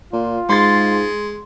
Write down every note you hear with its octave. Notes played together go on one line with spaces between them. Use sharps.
A#2 F4
G#2 G#3 C6 A6